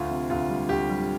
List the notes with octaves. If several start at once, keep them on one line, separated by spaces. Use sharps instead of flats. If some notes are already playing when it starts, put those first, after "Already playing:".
Already playing: D2 F4
C3
D2 F4
G3
D2 G4
G3